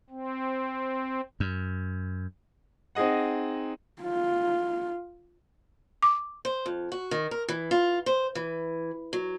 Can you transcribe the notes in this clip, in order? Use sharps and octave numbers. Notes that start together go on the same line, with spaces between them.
C4
F#2
C4 D#4 G#4 D#5 F#5
F4
D6
C5
F2
F#4
D#3
A#4
E3
F4
C5
E3
F#3